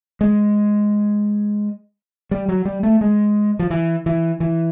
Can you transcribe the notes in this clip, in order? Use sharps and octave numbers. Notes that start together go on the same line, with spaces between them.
G#3
G3
F#3
G3
A3
G#3
F3
E3
E3
E3